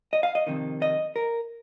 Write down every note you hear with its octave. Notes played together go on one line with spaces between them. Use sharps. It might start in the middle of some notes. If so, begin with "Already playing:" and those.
D#5
F5
D#5
F2 C3 D#3
D#5
A#4